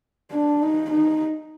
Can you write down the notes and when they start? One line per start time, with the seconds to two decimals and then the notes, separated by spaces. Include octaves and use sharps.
0.31 D4
0.62 D#4
0.91 D#4